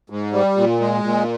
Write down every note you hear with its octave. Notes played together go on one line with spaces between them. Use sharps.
G#2
G3
A#2
G#3
A#2